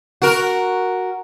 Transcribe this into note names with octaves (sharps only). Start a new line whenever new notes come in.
F#4 A#4